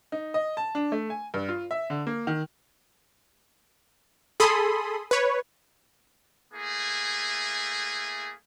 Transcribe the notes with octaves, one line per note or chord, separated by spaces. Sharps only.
D#4
D#5
A5
D4
A3
G#5
G2
F4
E5
D3
A#3
D#3
G#4 A4 B5 C6 D#6
B4 C#5
A3 A#3 E4 G#4 G#5